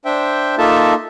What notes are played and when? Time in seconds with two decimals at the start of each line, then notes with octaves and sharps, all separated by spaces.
0.05 D4 C5 E5 G5
0.58 A#3 D#4 F4 A4 E5 A5